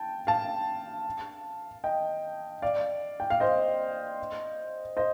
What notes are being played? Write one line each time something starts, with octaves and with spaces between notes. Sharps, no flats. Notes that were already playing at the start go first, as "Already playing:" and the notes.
Already playing: G5 A5
F5 A5
D#5 G5
D5 F5
G5
F5
C5 D#5
C5 D#5